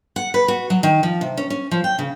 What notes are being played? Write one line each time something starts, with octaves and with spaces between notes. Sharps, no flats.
F#5
B4
F#4
F#3
D#3
F3
C3
C#4
C#4
F3
G5
C#3